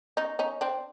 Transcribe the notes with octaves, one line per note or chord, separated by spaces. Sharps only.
C#4 D#4
C#4 D#4
C4 D4